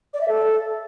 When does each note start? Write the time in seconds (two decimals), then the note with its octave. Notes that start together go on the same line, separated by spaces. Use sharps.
0.14 D5
0.21 E5
0.28 A4